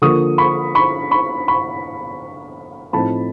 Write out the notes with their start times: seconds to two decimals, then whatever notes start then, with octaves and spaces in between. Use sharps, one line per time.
0.02 D3 F3 A#3 C#6 D#6
0.38 B5 C#6
0.75 B5 C#6
1.11 B5 C#6
1.48 B5 C#6
2.93 A2 F3 A3 C4 D#4 A5 B5